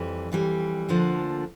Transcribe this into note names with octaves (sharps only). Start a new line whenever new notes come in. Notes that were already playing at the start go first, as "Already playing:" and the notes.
Already playing: F2 E3 G3
F2 E3 G3
D2 D3 F3 A#3 D4